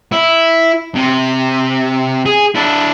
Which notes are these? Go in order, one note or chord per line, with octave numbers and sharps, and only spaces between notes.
E4
C3
G#4
D4 E4